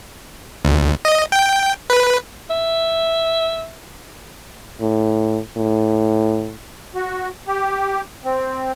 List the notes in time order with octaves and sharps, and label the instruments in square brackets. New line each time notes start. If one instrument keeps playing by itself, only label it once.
[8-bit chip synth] D2
D#5
G5
B4
[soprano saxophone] E5
[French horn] A2
A2
[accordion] F#4
G4
C4